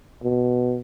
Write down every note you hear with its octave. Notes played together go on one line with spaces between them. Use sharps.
B2